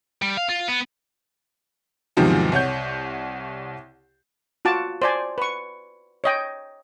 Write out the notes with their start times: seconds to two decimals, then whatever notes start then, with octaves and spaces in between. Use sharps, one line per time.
0.22 G3
0.37 F5
0.49 F4
0.68 B3
2.17 E2 G#2 C3 D#3 F3 F#3
2.52 C2 C#5 F#5 G6
4.65 F4 F#4 A5 D6
5.02 C5 D5 G#5
5.38 B4 C#6
6.24 C#5 D#5 G5